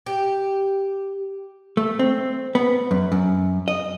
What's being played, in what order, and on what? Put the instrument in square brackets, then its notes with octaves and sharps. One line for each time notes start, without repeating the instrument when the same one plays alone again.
[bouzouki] G4
[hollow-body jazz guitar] A3
C4
B3
F#2
F#2
D#5